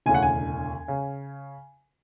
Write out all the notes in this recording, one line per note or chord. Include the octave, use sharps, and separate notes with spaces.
E1 D2 C#3 E3 G#5
F#5
G#5
C#3